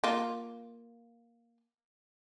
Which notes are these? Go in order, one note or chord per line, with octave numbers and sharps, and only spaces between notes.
A#3 F4